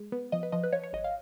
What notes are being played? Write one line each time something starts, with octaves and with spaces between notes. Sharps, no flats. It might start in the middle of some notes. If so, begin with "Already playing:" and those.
Already playing: G#3
B3
F3 D#5
B4
F3 D#5
B4
F3 C#5
C#5
G#1 D#5
F5